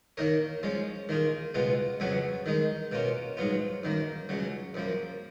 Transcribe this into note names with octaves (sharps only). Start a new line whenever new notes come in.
D#3 A#3 D#4 A#4 C#5
F3 G#3 C#4
D#3 A#3 F4 G#4
C#2 B2 G#3 B3 F4
F2 C#3 F#3 B3 F#4
D#3 G#3 D#4
B2 A#3 C#4 F4
G#2 F#3 B3 F4
F#2 D#3 A#3
C#2 C#3 F#3
F#2 F3 A#3